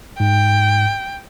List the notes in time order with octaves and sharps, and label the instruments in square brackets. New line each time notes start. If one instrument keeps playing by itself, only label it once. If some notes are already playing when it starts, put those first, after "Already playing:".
[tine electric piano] G#2 [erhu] G5